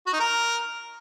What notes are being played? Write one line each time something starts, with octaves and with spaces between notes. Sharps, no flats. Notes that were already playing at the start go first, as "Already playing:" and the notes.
F#4
D#4
A#4